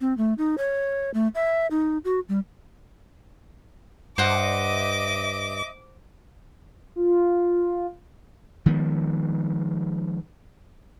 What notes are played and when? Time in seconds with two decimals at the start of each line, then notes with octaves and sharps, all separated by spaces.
0.01 C4
0.18 A3
0.38 D#4
0.58 C#5
1.14 A3
1.35 E5
1.71 D#4
2.05 F#4
2.29 G3
4.18 G2 C5 D#5 E5 F#5 D6
6.96 F4
8.66 D#3 F3 G#3 B3